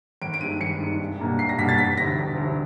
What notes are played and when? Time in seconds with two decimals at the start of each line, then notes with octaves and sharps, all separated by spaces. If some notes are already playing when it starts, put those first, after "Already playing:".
0.22 G#1 D7
0.34 D7
0.41 G2 D#3 G#3 D#7
0.60 G#1 C#7
0.80 G2 D#3 G#3
1.00 C2
1.19 B2 G3 A#3 D4
1.39 C2 C7
1.49 A#6
1.59 B2 G3 A#3 D4 B6
1.69 A6
1.78 E1 B6
1.98 D2 C3 A#6
2.17 E1
2.38 D2 C3